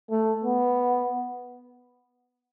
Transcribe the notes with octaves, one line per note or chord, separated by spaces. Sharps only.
A3
B3